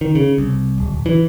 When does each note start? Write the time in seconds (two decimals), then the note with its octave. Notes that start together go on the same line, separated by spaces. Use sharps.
0.01 D#3
0.15 C#3
0.38 C2
0.78 D1
0.92 D#1
1.06 E3